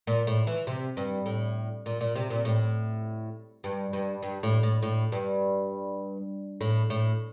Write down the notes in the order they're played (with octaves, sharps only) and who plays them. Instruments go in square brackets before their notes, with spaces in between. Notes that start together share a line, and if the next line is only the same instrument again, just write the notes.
[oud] A#2
A2
E3
C3
G2
A2
A#2
A#2
C3
A#2
A2
G2
G2
G2
A2
A2
A2
G2
A2
A2